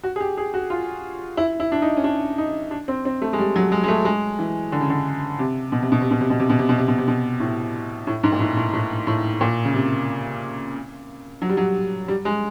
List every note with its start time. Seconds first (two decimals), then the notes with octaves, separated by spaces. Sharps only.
0.03 F#4
0.16 G#4
0.20 G4
0.38 G#4
0.54 F#4
0.70 F4
1.37 E4
1.60 E4
1.72 D4
1.82 D#4
1.97 C#4
2.04 D4
2.38 D#4
2.71 D4
2.88 C4
3.05 C4
3.22 A3
3.33 G#3
3.39 G3
3.56 F#3
3.72 G#3
3.83 G#3
3.88 A3
4.05 G#3
4.39 E3
4.72 D3
4.81 C#3
4.90 D3
5.39 C3
5.72 B2
5.82 C3
5.92 B2
6.01 C3
6.11 B2
6.21 C3
6.30 B2
6.40 C3
6.50 B2
6.59 C3
6.69 B2
6.78 C3
6.88 B2
6.98 C3
7.08 B2
7.40 A2
8.07 A2
8.23 G#2
8.32 A#2
8.40 A2
8.57 A2
8.73 A2
9.07 A2
9.41 A#2
9.65 C#3
9.74 C3
11.42 F#3
11.49 G3
11.57 F#3
12.08 G3
12.25 G#3